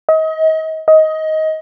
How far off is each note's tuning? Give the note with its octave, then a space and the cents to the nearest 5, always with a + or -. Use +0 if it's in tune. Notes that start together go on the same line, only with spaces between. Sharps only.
D#5 +35
D#5 +15